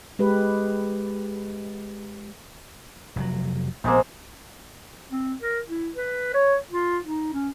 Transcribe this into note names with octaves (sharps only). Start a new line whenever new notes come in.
G#3 G4 B4
F1 A#2 F#3
A#1 C3 G#3 A#3 B3
C4
A#4
E4
B4
C#5
F4
D#4
C#4